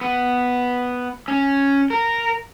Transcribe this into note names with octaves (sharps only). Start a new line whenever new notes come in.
B3
C#4
A#4